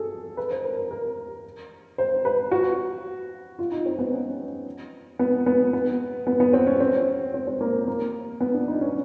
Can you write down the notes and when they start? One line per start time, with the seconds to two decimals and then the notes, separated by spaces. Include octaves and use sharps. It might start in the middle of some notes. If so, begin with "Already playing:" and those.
Already playing: F#4 G#4 A4
0.37 B4
0.51 C5
0.64 A#4
0.77 A#4
0.91 A#4
1.98 C5
2.25 B4
2.51 F#4
3.59 F4
3.72 D#4
3.86 C4
3.99 B3
4.12 C#4
5.19 B3
5.46 B3
5.73 B3
6.27 B3
6.40 B3
6.53 C4
6.67 C#4
6.80 C4
7.34 C4
7.48 C4
7.61 A#3
7.88 A#3
8.41 B3
8.54 D4
8.68 D#4
8.81 C#4